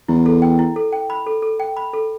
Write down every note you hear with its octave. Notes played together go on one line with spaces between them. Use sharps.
E2 E4
A4
G5
E4
A4
G5
B5
A4
A4
G5
B5
A4